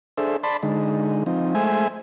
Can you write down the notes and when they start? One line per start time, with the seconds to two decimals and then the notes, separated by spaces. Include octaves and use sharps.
0.18 D4 G#4 A4 C5 E5
0.44 D5 A5 B5 C6
0.63 D3 G#3 D#4
1.26 F3 C4 D#4
1.55 G#3 A3 C5 E5 G#5